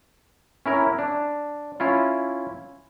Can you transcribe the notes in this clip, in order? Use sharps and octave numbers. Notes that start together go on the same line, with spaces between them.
C#4 E4 A#4
D4
C#4 E4 F4